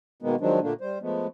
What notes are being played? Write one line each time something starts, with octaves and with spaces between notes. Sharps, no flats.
B2 D#3 G#3 A#3 B3
D#3 F3 F#3 G#3 D4
A#2 D3 A3 A#3 D4
G3 C5
F3 G#3 A3 B3